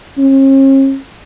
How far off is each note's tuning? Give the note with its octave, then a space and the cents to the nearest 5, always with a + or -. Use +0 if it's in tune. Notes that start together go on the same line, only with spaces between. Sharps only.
C#4 -45